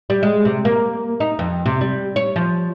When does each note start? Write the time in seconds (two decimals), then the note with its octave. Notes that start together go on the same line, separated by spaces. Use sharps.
0.10 G3
0.23 G#3
0.45 C3
0.65 A#3
1.20 D#4
1.39 F2
1.66 C3
1.81 G3
2.16 C#5
2.36 F3